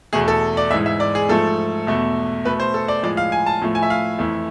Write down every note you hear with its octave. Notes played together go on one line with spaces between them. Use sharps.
E2 B2 A3 G#4
A4
D5
G#2 E3 G#3 E5
E5
D5
G#4
G#2 F3 A3 A4
E2 B2 A3
B2 A3 B4
C5
A4
D5
A2 F3 G#3 D5
F5
G#5
A5
A2 F3 A3
G#5
E5
F5
F2 E3 A3